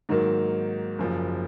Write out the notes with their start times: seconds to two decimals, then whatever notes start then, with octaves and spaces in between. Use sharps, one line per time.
0.09 G#2 D#3 F#3 A#3
0.98 F#1 F#2 F3